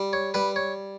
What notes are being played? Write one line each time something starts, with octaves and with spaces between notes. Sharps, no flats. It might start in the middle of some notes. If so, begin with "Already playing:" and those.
Already playing: G3
C#5
G3 B4
C#5